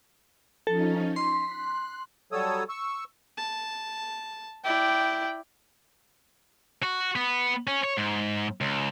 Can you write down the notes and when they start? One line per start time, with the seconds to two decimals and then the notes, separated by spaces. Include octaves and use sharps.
0.67 F3 C#4 D#4 A4
1.16 C6 B6
1.47 F#6
2.32 F#3 G3 A4 C#5 D#6 E6
2.69 C#6 E6
3.38 A5
4.64 E4 D5 G5
6.83 F#4
7.15 B3
7.67 C#4
7.84 C#5
7.98 G#2
8.61 C#2